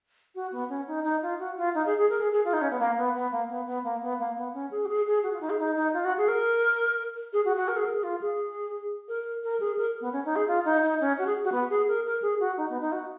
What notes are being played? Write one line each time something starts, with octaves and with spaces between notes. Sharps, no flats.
F#4
B3
C#4
D#4
D#4
F4
F#4
F4
D#4
G#4
G#4
A#4
G#4
G#4
F4
D#4
C#4
B3
A#3
B3
B3
A#3
B3
B3
A#3
B3
A#3
B3
C#4
G#4
F#4
G#4
G#4
F#4
F4
D#4
G#4
D#4
D#4
F4
F#4
G#4
A#4
G#4
F#4
F#4
A#4
G#4
A#4
G#4
F4
G#4
A#4
A#4
G#4
A#4
B3
C#4
D#4
G#4
F4
D#4
D#4
C#4
F#4
G#4
F#4
B3
G#4
A#4
A#4
G#4
F#4
D#4
B3
D#4
F#4